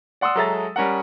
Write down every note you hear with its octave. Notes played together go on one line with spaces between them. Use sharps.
D5 F#5 C6 D#6 E6
F#3 G#3 A4 E5 A#5 A6
G3 C#4 A#4 F#5